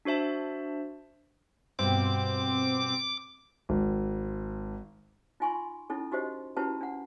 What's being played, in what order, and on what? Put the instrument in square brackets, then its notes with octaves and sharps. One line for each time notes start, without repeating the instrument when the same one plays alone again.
[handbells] D4 F#4 C5 E5 A5
[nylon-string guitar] G2 B2 [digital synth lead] C4 [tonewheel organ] D6
[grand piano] G#1
[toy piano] D#4 F4 G#5 C6 C#6
C#4 D#4 E4 A4
D#4 F#4 G4 C5 D#5
C#4 E4 F#4 G4 B4 A5
D4 F#5